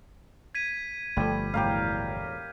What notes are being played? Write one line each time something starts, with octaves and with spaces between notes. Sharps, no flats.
G#6 B6 D#7
G1 F3 G3 A3 A4
E1 A2 G4 A#4 F5